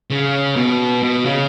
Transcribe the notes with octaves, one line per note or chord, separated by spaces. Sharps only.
C#3
B2
B2
C#3